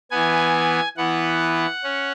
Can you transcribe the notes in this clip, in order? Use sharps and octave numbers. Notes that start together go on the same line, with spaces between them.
E3 B3 G#5
E3 B3 F#5
C#4